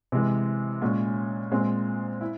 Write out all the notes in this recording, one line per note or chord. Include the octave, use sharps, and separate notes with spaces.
C3 E3 G#3
A#2 G#3 C#4
A#2 G#3 C4
E4